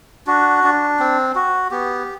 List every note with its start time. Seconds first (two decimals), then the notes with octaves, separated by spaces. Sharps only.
0.27 D4 F#4
0.64 D4
1.00 C4
1.35 F#4
1.71 B3 G4